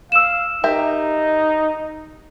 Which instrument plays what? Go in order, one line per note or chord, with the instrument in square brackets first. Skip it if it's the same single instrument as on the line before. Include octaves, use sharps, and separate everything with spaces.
[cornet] F5 [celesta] E6 E7
[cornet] D#4 [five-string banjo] G4 A#4 E5